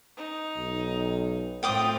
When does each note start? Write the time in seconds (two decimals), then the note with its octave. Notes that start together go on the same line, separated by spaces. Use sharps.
0.15 D#4
0.57 B1
1.63 A2 C4 F4 G5 D6 D#6